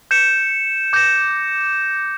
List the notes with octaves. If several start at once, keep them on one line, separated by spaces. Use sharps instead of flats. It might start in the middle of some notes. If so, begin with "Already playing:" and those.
G6 C#7 E7
D6 G6 A#6 E7